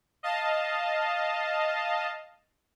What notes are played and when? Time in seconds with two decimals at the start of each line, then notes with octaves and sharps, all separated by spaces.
0.23 D#5 F5 A5